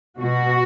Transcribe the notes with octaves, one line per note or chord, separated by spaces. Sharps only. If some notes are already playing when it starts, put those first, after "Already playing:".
B2 F#4